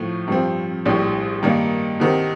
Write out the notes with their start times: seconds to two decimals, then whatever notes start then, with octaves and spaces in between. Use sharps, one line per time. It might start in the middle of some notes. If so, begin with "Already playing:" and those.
Already playing: A2 F3 A3
0.28 G2 F3 C4
0.85 A#1 A2 G3 D4
1.43 G2 D#3 A#3 D4
2.00 C2 C3 D#3